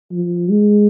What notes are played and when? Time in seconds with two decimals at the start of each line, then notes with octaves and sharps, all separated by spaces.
0.12 F3
0.50 G#3